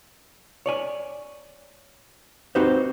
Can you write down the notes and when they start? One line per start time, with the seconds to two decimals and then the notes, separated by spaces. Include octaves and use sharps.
0.66 C#5 D5 G#5
2.55 C4 D#4 F#4 G4 B4 C5